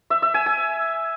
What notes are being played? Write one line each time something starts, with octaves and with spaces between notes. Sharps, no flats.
E5
E5
G#5
G#5